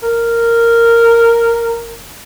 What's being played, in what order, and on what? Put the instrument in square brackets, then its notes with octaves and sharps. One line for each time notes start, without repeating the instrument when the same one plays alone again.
[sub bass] F#1 [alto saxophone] A#4